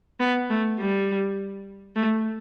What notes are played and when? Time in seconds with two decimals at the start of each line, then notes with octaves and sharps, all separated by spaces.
0.20 B3
0.50 A3
0.79 G3
1.96 A3